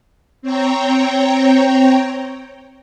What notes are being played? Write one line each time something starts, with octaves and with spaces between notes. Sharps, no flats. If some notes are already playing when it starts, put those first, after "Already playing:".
C4 C#5 G5 A#5